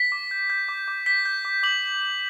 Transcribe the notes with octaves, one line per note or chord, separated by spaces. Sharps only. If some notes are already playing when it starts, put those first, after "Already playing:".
Already playing: B6
D6
G6
G6
D6
D6
G6 B6
G6
D6
D6 F#7